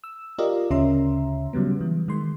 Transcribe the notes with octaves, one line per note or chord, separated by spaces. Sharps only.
E6
F4 G4 A#4 D5 D#5 F5
D2 C#3 C#4 E5 A#5 C6
C#3 F#3 G3 B3
E3
D#3 G#3 C6